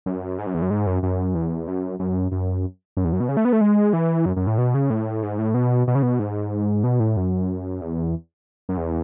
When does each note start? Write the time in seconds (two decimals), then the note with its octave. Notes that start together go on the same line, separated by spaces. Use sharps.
0.06 F#2
0.39 G#2
0.46 F#2
0.54 E2
0.62 F#2
0.70 G#2
0.87 F#2
1.03 F#2
1.35 E2
1.68 F#2
1.99 F#2
2.32 F#2
2.97 F#2
3.05 E2
3.13 F#2
3.20 B2
3.29 C#3
3.37 A3
3.45 B3
3.53 A3
3.61 G#3
3.93 E3
4.26 F#2
4.36 F#2
4.47 A2
4.58 B2
4.74 C#3
4.90 A2
5.23 G#2
5.39 A2
5.54 B2
5.88 B2
5.95 C#3
6.03 B2
6.19 G#2
6.84 B2
7.00 A2
7.17 F#2
7.81 E2
8.69 F#2
8.77 E2